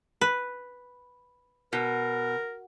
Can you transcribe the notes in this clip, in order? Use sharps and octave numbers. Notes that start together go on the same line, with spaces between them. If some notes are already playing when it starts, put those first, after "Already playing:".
B4
B2 A#4